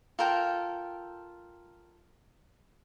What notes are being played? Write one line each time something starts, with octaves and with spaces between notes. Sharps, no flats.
F4 A4 A#4 G5